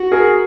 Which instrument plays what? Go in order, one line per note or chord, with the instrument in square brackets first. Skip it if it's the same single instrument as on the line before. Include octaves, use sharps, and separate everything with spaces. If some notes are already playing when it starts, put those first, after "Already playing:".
Already playing: [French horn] F#4
[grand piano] G#4 A#4